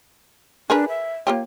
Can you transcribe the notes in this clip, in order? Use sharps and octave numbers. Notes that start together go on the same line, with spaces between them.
D4 G#4 A#4 B4
E5
A#3 F4 G4 C#5